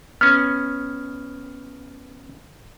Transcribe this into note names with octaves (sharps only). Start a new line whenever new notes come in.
B3 C#4 F6